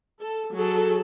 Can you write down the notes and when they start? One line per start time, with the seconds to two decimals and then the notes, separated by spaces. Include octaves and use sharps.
0.21 A4
0.53 F#3 G#4 A4